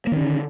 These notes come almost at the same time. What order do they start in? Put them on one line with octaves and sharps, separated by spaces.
A#3 D#3 C#4 D3